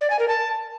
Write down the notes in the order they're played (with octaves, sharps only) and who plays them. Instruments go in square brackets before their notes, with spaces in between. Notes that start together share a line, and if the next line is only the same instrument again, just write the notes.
[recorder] D5
G#5
A#4
A5